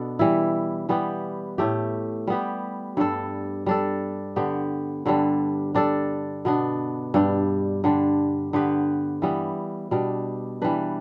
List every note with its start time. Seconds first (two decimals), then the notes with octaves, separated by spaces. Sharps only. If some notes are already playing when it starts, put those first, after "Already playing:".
Already playing: B2 B3 D4 A4
0.19 E3 G3 E4
0.89 E3 G3 B3 G4
1.58 A2 A3 G4
2.27 G3 B3 G4
2.97 G2 G3 D4 A4
3.66 G3 D4 A4
4.36 D3 B3 G4
5.06 G2 D3 G3 D4
5.75 G3 D4 A4
6.45 B2 B3 D4
7.14 G2 G3 D4
7.84 D3 G3 D4
8.53 D3 B3 G4 B4
9.22 E3 G3 B3
9.91 B2 G3 D4
10.62 E3 G3 D4 B4